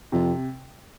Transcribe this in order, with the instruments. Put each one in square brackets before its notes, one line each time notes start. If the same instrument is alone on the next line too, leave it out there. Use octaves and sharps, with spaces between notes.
[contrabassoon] F2 [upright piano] C3